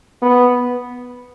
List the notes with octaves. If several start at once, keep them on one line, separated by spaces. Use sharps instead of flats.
B3